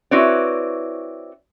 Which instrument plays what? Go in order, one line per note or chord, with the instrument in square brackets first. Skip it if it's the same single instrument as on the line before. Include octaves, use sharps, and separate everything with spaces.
[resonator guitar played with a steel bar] C4 E4 F#4 B4 C#5 D5